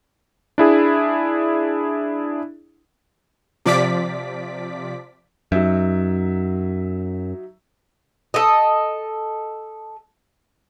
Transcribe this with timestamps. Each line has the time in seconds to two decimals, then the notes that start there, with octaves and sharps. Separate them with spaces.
0.58 D4 E4 G#4
3.66 C3 F3 D5 D6 B6
5.52 F#2 F#3 D#4 E5
8.34 A4 D#5